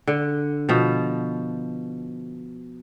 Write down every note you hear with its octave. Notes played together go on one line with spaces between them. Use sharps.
D3
B2 F3